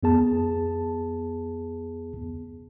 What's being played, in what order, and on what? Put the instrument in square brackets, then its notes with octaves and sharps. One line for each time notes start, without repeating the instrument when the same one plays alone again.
[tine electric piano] F2 B3 G#4 A5